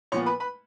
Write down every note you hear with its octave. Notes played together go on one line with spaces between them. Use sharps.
A#2 F3 B3 C#5 C#6
B4 B5
B4 B5